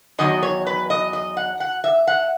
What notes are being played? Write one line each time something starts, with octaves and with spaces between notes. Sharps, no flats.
E2 D#3 F#3 D#5
C#5
B4
D#5
D#5
F#5
F#5
E5
F#5